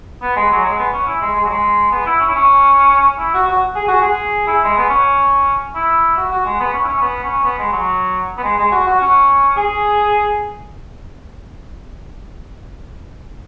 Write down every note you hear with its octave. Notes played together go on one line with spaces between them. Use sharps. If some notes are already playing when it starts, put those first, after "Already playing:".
B3
G#3
F#3
G#3
B3
C#4
E4
G#3
G#3
F#3
G#3
B3
E4
C#4
E4
C#4
E4
F#4
F#4
G#4
F#4
G#4
E4
G#3
B3
C#4
E4
F#4
F#4
G#3
B3
C#4
E4
C#4
B3
C#4
B3
G#3
F#3
B3
G#3
G#3
F#4
F#4
C#4
G#4